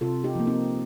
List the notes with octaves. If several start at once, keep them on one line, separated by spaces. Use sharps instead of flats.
C3 F4 A4
D#4 G4
F3 A#3
C4 D#4